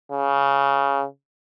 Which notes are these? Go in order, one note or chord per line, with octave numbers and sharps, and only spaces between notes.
C#3